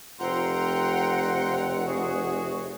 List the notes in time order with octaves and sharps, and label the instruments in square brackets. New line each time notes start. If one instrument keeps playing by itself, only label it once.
[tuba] F1 [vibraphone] F4 C5 E6 [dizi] F#5 [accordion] G5 A#5 C6
[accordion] F#4 G#4